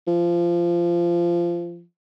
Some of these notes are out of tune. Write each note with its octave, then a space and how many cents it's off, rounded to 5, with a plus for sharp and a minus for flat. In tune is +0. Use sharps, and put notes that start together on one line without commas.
F3 -20